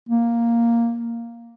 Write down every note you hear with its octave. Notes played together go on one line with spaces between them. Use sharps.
A#3